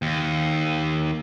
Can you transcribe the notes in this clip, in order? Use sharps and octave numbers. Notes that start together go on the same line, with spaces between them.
D#2